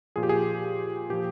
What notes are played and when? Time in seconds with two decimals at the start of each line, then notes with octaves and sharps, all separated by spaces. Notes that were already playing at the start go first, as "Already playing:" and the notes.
0.16 A#2 F3 G#4
0.23 G4
0.29 G#4
1.09 A#2 F3 G4